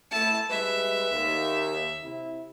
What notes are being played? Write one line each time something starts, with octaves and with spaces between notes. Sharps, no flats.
A3 E4 A5
G3 G#3 B4 E5
D#2
C3 E4